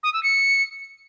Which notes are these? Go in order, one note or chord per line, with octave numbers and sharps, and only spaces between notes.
D#6
E6
C#7